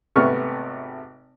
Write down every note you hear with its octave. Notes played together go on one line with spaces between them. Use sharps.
G#1 C3 A3 B3 C#6 F6